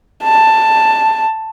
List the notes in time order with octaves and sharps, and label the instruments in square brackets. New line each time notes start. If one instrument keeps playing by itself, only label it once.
[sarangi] A5